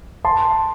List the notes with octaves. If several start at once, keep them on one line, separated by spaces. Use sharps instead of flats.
A5 C6